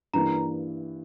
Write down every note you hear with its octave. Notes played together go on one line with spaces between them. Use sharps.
G2 E3 A#3 A#5